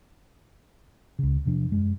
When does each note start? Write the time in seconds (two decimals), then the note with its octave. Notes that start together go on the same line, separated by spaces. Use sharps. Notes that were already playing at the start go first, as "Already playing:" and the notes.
1.19 C#2 C#3
1.45 E2 C3 F3 D4
1.72 F#2 G#3